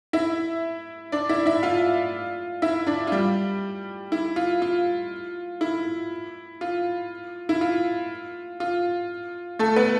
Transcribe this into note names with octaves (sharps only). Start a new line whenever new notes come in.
E4 E5
D4 D5
E4 E5
E4 E5
F4 F5
E4 E5
D4 D5
F4
G3 G4
E4
F4
F4
E4
F4
E4
F4
F4
A3 A4
B3 B4